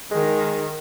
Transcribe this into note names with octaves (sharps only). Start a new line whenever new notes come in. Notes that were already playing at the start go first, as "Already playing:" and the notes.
D#3 G#3